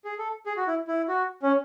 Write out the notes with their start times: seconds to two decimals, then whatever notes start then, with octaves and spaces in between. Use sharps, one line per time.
0.05 G#4
0.19 A4
0.46 G#4
0.57 F#4
0.67 E4
0.88 E4
1.08 F#4
1.43 C#4